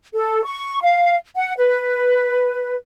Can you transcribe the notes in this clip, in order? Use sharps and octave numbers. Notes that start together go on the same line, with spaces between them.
A4
C#6
F5
F#5
B4